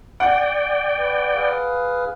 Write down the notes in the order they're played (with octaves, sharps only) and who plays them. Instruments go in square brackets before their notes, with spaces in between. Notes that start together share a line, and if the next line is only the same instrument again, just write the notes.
[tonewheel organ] D5 G5 [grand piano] F#5
[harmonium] B4
G#4 B4 F5